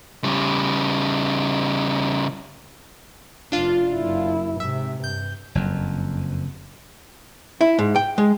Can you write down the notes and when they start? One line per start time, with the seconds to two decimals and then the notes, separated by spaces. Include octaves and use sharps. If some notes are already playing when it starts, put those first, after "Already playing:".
0.24 C#3 G3
3.52 F1 D4 F4
3.93 F#1 E4
4.60 G#2 C3 E5
5.04 G2 G6
5.55 F#1 F2
7.61 E4
7.79 G#2
7.96 G5
8.18 G#3